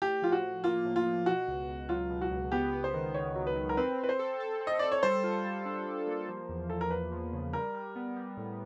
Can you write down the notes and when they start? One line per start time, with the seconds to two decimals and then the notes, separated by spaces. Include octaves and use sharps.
0.02 A2 G4
0.22 F3 F4
0.32 F#4
0.43 A2
0.64 A#3 F4
0.85 A2
0.96 F4
1.06 F3
1.26 B2 F#4
1.48 C#2
1.69 C#2
1.89 F#3 F4
2.10 B2
2.21 F#4
2.31 C#2
2.52 B3 G4
2.73 B3
2.84 C5
2.94 D#3
3.14 D#3 C#5
3.35 F#3
3.47 B4
3.56 D#3
3.69 A#4
3.77 C4 B4
3.98 C4
4.03 B4
4.09 C5
4.19 A4
4.40 A4
4.61 C4
4.67 D#5
4.79 A4 D5
4.92 C#5
5.03 G3 C5
5.24 F4
5.44 G3
5.66 D4
5.86 G3
6.07 A#3
6.28 F3
6.49 E2
6.70 E2 A4
6.81 A#4
6.90 E2 B4
7.12 F3
7.33 C#3
7.53 G3 A#4
7.74 G3
7.96 B3
8.17 G3
8.37 A2